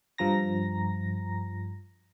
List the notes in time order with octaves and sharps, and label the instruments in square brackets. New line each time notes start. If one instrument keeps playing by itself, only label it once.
[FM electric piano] G2 F3 A#5 A#6